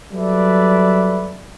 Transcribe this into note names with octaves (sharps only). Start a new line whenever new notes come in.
F#3 G3 A4 B4 D5 E5